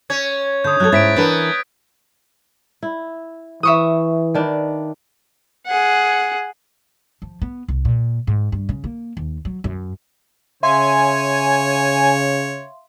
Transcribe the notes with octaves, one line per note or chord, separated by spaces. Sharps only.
C#4 G#6
D3 D#6 G6
F#3 G4 A4 F#6 G#6
G#2 C#4 E4 A6 B6 D7
E3 B3 D4 A#4
E4
E3 B4 E5 C#6 D#6
D#3 D4 B4
G#4 F#5
F3
B3
C2
A#2
G#2
G2
C#3
A#3
D#2
F#3
F#2
C#3 C#5 E5 F5 G#5 C6